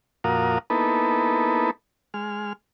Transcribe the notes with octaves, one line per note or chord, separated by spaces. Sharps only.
F2 A#2 F#4 A#4 F5 D#6
A#3 B3 D#4 E4 A4 B4
G#3 F6